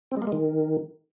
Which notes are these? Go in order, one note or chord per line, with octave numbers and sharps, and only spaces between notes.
C4
G#3
A#3
G#3
D#3